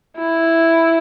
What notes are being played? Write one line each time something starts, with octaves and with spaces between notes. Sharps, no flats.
E4